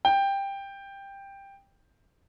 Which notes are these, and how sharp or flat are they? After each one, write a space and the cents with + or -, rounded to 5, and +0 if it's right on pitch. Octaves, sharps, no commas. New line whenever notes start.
G5 +10